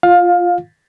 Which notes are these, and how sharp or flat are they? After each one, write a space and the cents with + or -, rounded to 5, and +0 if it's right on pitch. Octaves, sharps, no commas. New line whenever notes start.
F4 +0 F5 +20